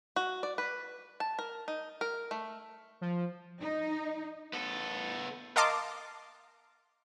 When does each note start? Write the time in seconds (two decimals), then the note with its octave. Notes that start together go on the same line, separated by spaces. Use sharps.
0.16 F#4
0.43 D5
0.58 B4
1.20 A5
1.39 A#4
1.68 D#4
2.01 A#4
2.31 A3
3.01 F3
3.61 D#4
4.53 B3 A4
5.56 A#4 D#5 F5 A5 C6 D6